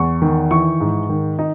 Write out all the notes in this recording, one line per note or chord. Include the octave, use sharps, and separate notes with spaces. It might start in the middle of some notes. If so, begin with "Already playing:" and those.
Already playing: E2 C#6
D#3
E3 C#6
G#2
D#3
D#4